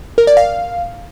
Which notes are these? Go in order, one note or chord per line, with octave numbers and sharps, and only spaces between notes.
A#4
D5
F5